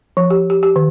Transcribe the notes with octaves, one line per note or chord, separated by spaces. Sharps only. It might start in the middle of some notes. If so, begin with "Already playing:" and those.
F3
G4
G4
G4
D#3